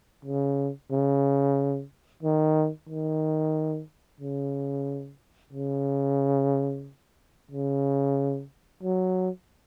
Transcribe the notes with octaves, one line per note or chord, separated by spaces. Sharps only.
C#3
C#3
D#3
D#3
C#3
C#3
C#3
F#3